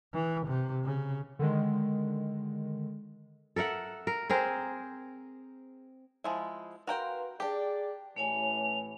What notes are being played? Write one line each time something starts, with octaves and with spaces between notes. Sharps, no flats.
E3
C3
C#3
D3 D#3 G#3
A4 A#4 E5 F#5
A#4
C4 G#4 A#4 C5
F3 G#3 E4
F#4 A#4 B4 F5 G5 A#5 C6
D4 G4 G#4 D5 G5
A1 A2 E3 A3 C#5 G#5 F7